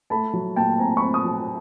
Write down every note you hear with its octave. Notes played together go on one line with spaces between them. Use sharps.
A3 A5 B5
F#3
A#2 G5 A5
C4 G#5 A#5
B5 C#6
C4
C#6 D#6
F#3